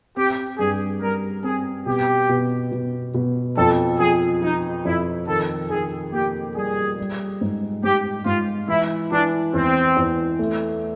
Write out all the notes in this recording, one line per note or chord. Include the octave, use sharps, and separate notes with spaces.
C4 G4
G2 G#4
G3 A#4
C4 G#4
B2 G4
B2
B2
B2
F2 A4
F3 G#4
F3 D#4
F2 E4
D#3 A4
D#3 G#4
A#3 G4
G3 G#4
G3
G#2
G#2 G4
G#2 F4
E3 E4
E3 D4
E2 C4
E2
A3